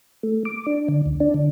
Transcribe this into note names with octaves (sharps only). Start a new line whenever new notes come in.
A3
D6
D4
D3
D2
D4
D3